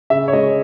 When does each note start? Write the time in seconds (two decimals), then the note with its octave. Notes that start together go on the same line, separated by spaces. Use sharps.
0.10 C#3 E5
0.28 C#5
0.33 G#3 D#5